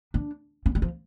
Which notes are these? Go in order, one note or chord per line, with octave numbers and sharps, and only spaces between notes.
D4
C#4
G3
F3